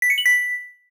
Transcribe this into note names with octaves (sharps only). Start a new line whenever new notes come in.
B6
C#7
F#7
B6